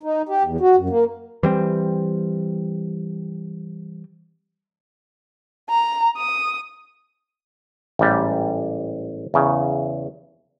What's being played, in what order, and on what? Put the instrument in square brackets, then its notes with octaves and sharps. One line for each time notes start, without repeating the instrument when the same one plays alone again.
[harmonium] D#4
G4
E2
F#4
F#2
A#3
[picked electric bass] E3 G3 C4
[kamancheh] A#5
D#6
[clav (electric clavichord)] A1 G#2 G3
E2 C#3